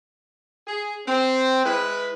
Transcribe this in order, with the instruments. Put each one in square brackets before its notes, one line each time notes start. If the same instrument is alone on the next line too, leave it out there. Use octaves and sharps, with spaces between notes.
[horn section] G#4
C4
G#3 E4 B4